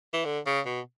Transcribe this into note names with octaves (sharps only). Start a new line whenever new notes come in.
E3
D3
C#3
B2